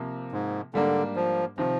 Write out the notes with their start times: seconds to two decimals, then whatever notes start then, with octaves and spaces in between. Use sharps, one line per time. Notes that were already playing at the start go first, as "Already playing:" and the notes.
Already playing: C3 F3 A#3
0.32 G#2
0.74 G#2 D3 G3 A#3 D4
1.16 F3
1.58 C3 D#3 F3